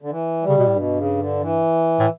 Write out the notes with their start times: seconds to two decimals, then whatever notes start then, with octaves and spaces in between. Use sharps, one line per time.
0.02 D3
0.10 E3
0.43 G3
0.49 C#3
0.58 B2
0.67 A2
0.76 G2 B2
0.97 C#3
1.19 D3
1.41 E3
1.99 A2